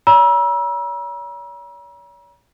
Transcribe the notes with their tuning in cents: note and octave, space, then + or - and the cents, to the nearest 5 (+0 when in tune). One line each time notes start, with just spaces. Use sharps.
C#5 +45 A#5 +45 E6 +0